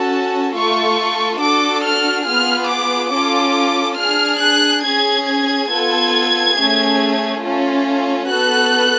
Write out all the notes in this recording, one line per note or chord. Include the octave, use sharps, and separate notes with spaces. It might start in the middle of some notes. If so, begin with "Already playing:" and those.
Already playing: C#4 F#4 A4 A5
A3 F4 A4 C#6
D4 F#4 A4 D6
F6
B3 F4 G#4 F6
D6
C#4 F4 A4 D6
D4 G#4 F6
F#6
C#4 G#4 G#6
G#6
B3 F4 A4 G#6
A3 C#4 G#4
A3 C#4 F4 A4
B3 F#4 A4 F#6